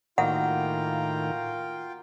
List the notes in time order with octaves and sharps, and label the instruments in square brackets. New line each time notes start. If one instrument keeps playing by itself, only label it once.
[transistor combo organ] A2 D#3 A#5 [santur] A#3 F#4 [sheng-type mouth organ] F4 G5 [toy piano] F#5